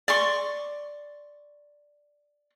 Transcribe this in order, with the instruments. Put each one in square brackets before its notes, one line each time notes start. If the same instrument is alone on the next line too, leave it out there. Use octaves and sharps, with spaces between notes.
[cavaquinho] D5 C6 C#6